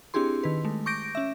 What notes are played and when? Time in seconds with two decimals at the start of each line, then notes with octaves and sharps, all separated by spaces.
0.14 C4 D4 E4 G4 G#4 C6
0.43 D#3 B4
0.65 G#3 A3
0.86 C#6 D6 G6 A#6 D7
1.15 C#4 E5